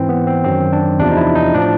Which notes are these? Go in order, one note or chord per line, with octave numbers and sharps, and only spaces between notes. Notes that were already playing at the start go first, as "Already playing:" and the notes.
Already playing: G#2 E3 C4
B3
C4
F#2 D#3 F#3 C4
D4
E2 C3 F3 D4
D#4
E4
D#4
A2 F3 D4